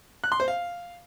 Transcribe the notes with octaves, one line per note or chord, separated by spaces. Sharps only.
F#6
C6
C5
F5